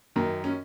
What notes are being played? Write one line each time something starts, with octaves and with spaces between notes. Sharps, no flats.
F#2 D#3
C#4